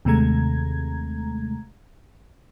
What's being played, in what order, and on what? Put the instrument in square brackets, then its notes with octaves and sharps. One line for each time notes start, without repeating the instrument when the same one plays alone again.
[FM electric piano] D#2 C3 G#3 A3 A#5 G#6